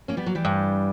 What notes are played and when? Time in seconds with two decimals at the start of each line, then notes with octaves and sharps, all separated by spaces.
0.08 A#3 C#4
0.17 G3 B3
0.26 F#3 A#3
0.35 E3 G3
0.45 G2